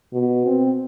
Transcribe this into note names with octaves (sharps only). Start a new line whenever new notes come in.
B2
C4